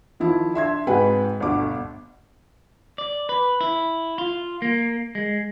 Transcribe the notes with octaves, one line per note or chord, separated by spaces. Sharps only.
D#3 F3 E4
D4 E5 C6 G#6
G#2 C3 F#4 B4 G5 G#5
G1 D2 B2 D6
D5
B4
E4
F4
A#3
G#3